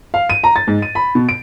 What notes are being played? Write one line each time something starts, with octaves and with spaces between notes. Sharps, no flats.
F5
D#7
A#5
A6
G#2
D#7
B5
B2
D7